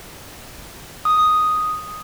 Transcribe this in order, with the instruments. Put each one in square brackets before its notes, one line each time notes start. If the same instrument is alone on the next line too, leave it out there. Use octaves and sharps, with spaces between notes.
[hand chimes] D#6